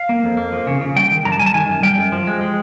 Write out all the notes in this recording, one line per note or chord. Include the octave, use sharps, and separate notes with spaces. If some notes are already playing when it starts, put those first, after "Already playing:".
Already playing: F5
A#3
F2
A#3
F3
C#3
C#3
G3 G5
D#3
F#2 A#5
A5
G3 G#5
A5
D#3 G#5
F#2
G3 G5
F#2
F3
G#3
G#3